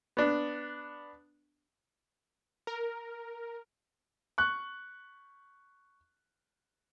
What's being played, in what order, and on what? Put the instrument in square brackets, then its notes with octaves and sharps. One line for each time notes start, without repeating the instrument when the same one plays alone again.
[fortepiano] B3 D4
[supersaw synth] A#4
[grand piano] C#6 F#6